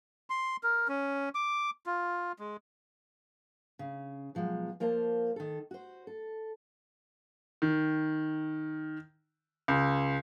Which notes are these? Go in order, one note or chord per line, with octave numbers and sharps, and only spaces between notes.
C6
A#4
C#4
D6
F4
G#3
C#3
B2 F3 F#3 G#3
F3 A#3 A#4 C5 A5
D#3 A4
F#4 C5
A4
D#3
C#2